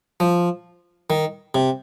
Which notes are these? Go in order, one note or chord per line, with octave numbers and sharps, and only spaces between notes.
F3
D#3
C3